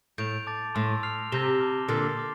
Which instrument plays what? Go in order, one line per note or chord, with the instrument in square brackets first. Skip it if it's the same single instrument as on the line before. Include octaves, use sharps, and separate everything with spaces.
[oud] A2 [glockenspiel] G6 D7 F7
[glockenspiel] A5 D6 A6
[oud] A2 [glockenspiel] A5 C6 E6
[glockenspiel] F6 C7 F7
[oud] C3 [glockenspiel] E6 G6 A#6 E7 G7
[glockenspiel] A5 D6 F6
[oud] A#2 D3 [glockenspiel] C6 F6 A6 C7
[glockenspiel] A5 D6 F6